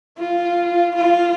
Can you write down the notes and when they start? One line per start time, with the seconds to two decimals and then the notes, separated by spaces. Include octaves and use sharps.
0.18 F4
0.95 F4